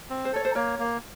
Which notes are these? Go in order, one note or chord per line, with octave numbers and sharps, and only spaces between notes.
C4
C5
A4 C#5
C5
A#3 A#4 C#5
A#3